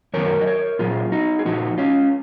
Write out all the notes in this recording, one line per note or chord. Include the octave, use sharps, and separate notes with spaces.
F#2 D#3 F#3 A#4 C#5
D#5
A#4 C#5
A#2 F#3 F4 G#4
D#4 F#4
G#4
A#2 F3 D#4 F#4
C#4 F4